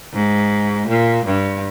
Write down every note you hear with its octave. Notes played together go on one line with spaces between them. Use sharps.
G#2
A#2
G2